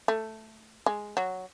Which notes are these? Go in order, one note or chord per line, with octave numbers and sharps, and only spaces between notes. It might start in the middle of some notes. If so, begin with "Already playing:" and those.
A3
G#3
F#3